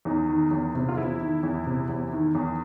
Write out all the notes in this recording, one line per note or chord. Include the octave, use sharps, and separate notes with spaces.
E2 D#4
D#3
E2
C3
F4
E2 E4
D#3
E2
C3
E2
D#3
E2